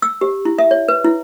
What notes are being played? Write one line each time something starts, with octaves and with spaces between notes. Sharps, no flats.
E6
G4
E4
E5
C#5
B4
E4